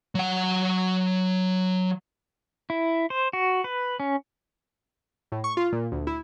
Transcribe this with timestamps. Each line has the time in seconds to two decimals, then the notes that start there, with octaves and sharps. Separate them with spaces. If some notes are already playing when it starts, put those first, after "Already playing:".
0.15 F#3 F#5
2.70 E4
3.10 C5
3.33 F#4
3.64 B4
4.00 C#4
5.32 A2
5.44 C#6
5.57 F4
5.72 A#2
5.92 D2
6.07 E4